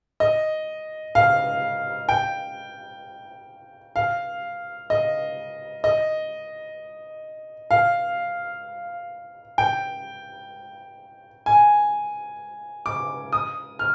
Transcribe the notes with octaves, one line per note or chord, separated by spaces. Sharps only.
D#5
F5
G5
F5
D#5
D#5
F5
G5
G#5
D6
D#6
F6